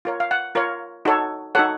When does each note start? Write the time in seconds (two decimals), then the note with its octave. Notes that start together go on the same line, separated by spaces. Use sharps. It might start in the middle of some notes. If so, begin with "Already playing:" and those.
0.05 F4 A#4 C#5
0.20 F5
0.31 F#5
0.55 F4 A#4 C#5
1.05 D#4 F#4 A4 C#5
1.55 D#4 F#4 A4 C#5 F#5